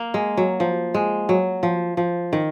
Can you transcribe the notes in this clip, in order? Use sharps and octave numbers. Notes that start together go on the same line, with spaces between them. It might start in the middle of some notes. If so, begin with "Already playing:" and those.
Already playing: A#3
G#3
F#3
F3
G#3
F#3
F3
F3
D#3